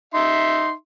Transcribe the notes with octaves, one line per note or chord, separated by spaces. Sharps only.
D#4 E5 C6